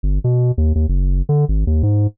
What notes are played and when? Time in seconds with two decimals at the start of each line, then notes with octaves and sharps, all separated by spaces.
0.03 G1
0.24 B2
0.58 D#2
0.75 D#2
0.89 F#1
1.29 D3
1.49 G#1
1.67 D#2
1.83 G#2